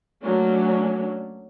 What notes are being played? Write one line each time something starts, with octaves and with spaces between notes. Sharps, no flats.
F#3 A3 A#3 C#4 D4